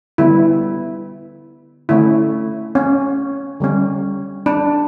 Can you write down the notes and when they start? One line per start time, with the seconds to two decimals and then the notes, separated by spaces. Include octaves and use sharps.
0.18 D3 G3 B3 E4
1.89 D3 A3 C#4 E4
2.75 C#4
3.60 D3 G3 C#4
4.46 D4